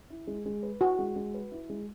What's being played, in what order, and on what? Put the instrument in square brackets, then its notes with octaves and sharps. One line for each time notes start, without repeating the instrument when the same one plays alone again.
[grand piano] E4
G#3
G#3
B4
[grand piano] E4 [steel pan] F#4
[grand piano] G#3
G#3
B4
E4
G#3